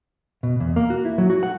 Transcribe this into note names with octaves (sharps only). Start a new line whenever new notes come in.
B2
E2
A#3
F#4
E4
F#3
F#4
F#5